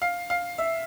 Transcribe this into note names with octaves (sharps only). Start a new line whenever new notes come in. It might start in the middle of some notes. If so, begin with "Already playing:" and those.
F5
F5
E5